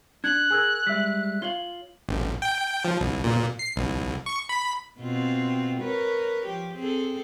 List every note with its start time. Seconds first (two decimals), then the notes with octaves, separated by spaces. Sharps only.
0.24 D4 F#6 G#6
0.50 G#4 A#4 G#5 E6 G#6
0.87 G3 G#3 E5 E6 B6
1.42 F4 C#5 F5 F#7 G7
2.09 A1
2.42 G5
2.85 F3
3.00 C2
3.24 A#2
3.59 C7
3.76 C2
4.26 C#6
4.49 B5
5.00 B2 C4 F4
5.80 A#4 B4 C#5
6.46 F3 G4
6.76 C4 G#4 A4